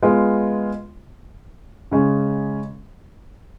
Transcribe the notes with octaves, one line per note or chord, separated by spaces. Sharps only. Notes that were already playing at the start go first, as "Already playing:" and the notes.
G#3 B3 F4
C#3 G#3 C#4